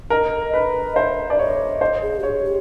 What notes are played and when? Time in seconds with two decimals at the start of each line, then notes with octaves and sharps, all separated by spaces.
0.10 A#4 D#5
0.54 B4 D#5
0.96 C5 E5
1.30 D5
1.39 C#5 D#5
1.81 C5
2.02 G#4
2.19 G4
2.23 G#4 C#5
2.45 G4